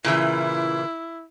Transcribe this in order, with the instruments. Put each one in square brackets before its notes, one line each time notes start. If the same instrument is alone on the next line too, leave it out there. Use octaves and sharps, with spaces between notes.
[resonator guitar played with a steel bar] A#2 C#3 E3 [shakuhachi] E4